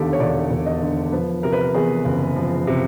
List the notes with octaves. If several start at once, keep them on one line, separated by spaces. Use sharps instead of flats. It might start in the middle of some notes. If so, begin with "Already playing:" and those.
Already playing: E1 D#2 D3 G4 A4
C#5
E1 D5
E1
D#5
D3
F3 B4
C3 A#4
B4
A#4
E2 G#4
F#1
F3
C3